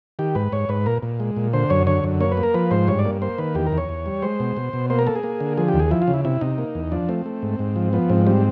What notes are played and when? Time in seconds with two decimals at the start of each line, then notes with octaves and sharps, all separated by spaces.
0.19 D#3 G4
0.35 G#2 B4
0.52 G#2 C#5
0.69 G#2 B4
0.86 A#2 A#4
1.03 A#2
1.20 G#3
1.37 A#2
1.53 D3 C5
1.70 F#2 C#5
1.87 D3 C#5
2.04 F#2
2.21 A#3 C#5
2.32 B4
2.37 A#3
2.43 A#4
2.54 F3 B4
2.71 G#2 C5
2.88 G2 C#5
2.99 D5
3.05 A#3
3.22 A#3 C5
3.38 D#3 B4
3.55 E2 G4
3.67 A#4
3.72 E2
3.78 C#5
3.89 E2
4.06 G3
4.22 G#3 C5
4.40 B2
4.57 B2
4.73 B2
4.90 A#3 C5
4.99 A#4
5.07 A#3 A4
5.16 G#4
5.23 A#3
5.40 D3
5.57 F3 G#4
5.68 G4
5.74 D#2
5.79 G#4
5.91 F3 E4
6.02 F4
6.08 C#3
6.14 E4
6.25 C3 E4
6.41 C3 D#4
6.58 A#3
6.75 E2
6.92 F3 D4
7.09 A3 C4
7.26 A3
7.42 G#2
7.59 G#2
7.76 F3
7.93 F3 B3
8.10 G#2 C4
8.27 G3 C4